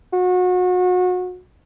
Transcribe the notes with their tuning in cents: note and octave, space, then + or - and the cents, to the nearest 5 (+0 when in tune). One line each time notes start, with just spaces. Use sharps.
F#4 -30